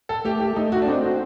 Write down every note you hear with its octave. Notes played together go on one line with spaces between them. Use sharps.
A4
A3 G4
G4
A3 D#4
F#4
D4
C4 D#4
F#4